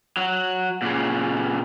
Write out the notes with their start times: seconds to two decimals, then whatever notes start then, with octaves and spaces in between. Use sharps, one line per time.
0.17 F#3
0.82 A#2 C#3